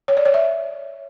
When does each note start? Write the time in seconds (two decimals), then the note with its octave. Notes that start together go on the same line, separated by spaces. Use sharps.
0.08 C#5
0.17 D5
0.25 C#5
0.34 E5